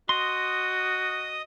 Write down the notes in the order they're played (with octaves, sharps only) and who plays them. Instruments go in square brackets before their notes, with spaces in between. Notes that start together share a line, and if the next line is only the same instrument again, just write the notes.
[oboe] F#4 [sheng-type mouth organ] D#5 D#6 [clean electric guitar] C6